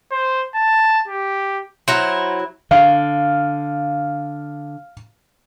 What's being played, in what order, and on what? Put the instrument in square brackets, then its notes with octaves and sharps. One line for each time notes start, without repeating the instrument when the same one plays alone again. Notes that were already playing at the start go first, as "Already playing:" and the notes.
[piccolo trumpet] C5
A5
G4
[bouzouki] F#3 E4 [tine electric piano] C5 F#5 A#5
[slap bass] D3 [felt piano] F5